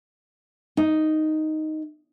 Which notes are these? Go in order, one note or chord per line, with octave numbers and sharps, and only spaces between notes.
D#4